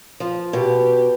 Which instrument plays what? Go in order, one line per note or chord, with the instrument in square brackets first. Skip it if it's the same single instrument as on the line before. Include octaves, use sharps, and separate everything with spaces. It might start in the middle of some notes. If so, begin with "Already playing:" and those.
[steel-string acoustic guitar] F3
[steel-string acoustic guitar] B2 [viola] G4